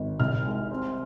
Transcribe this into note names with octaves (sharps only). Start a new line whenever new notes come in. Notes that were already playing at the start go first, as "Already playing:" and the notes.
Already playing: G#1
C2 F6
G#3
C4